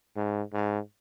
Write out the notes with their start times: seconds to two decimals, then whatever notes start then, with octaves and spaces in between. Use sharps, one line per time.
0.16 G#2
0.53 G#2